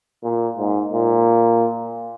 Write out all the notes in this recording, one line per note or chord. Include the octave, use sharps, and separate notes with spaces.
A#2
G#2
A#2